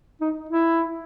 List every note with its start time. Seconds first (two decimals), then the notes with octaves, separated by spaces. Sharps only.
0.21 D#4
0.49 E4